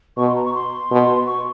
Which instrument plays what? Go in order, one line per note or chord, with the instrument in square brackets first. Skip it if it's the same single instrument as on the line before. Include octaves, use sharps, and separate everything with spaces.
[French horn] B2 [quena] C#6
[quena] C6
A#5
C#6
C6
[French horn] B2
[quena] C#6